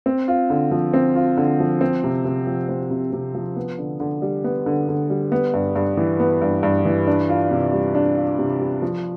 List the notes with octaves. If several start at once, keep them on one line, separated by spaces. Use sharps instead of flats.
C4
F4
D3
F3
C4
F4
D3
F3
C4
C3
C3
F3
C4
C3
C3
F3
B3
D3
D3
G3
B3
D3
D3
G3
B3
G2
G2
E3
B3
G2
G2
E3
D4
F4
C3
G3
D4
F4
C3
G3
F3